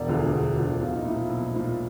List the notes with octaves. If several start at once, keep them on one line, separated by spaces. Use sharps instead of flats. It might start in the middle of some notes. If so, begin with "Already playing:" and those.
Already playing: E1 D5
D2 D3 F3 G#4
E1 F#4
D2 D3 F3
B1 F4
D#4
A#2 F3 E4
B1
A#2 F3